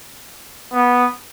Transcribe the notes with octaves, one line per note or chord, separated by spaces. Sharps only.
B3